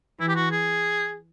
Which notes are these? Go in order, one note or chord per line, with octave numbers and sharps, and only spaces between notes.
E3 E4
G4
F#4
G#4